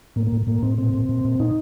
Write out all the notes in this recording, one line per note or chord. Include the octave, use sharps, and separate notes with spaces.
A2 A#3
A#3
A2
A2 A#3
A2 C4
A#2 C4
A#2
A#2
A#2
A#2 D#4